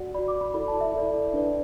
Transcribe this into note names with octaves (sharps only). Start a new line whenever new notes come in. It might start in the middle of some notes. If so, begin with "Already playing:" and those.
Already playing: F#4 D5 F#5
F#4 D5 B5
D6
B5
E4 A4 D5 B5
A5
E5
E4 A4 D5
D4 B4 D5